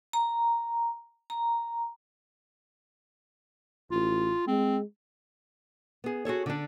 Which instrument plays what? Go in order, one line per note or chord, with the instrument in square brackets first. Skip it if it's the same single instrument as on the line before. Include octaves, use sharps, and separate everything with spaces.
[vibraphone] A#5
A#5
[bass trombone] A1 [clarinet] F4
[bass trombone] G#3 [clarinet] C4
[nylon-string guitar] B3 G#4
F#4 G#4 A4 C#5
D3 D4